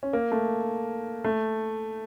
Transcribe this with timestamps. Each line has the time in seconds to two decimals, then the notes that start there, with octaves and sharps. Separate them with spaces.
0.03 C#4
0.13 A#3
0.32 A3
1.24 A3